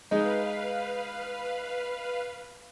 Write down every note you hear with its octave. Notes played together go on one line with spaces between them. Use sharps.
G#3 D#4 B4 F5